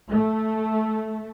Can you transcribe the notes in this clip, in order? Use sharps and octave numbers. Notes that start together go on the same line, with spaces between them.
A3